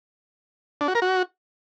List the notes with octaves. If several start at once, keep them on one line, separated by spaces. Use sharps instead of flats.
D4
F#4
A#4
F#4